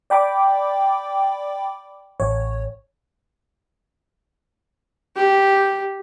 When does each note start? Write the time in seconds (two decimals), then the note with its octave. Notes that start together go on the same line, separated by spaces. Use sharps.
0.10 D5 G5 B5 D6
2.20 A1 C#5
5.16 G4